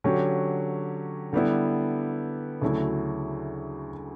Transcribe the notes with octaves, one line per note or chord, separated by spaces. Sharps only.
D3 F#3 C#4 G4
D3 G3 B3 E4
D2 C#3 F#3 A3 E4